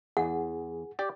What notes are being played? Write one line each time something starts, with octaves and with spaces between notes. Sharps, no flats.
E2 G#4 F#5
G4 D5